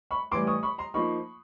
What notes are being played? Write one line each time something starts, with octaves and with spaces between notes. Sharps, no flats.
B5 C#6
A2 E3 G3 C6 D6
C#6 D#6
B5 C#6
A#5 C6
F3 A#3 D#4 B5 C#6